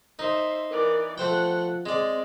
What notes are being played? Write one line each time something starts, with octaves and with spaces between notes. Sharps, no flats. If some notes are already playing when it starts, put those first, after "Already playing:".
D#4 C5 E5
E3 A#4 D5
F3 A3 C5 F#5 G5
G#3 C4 D5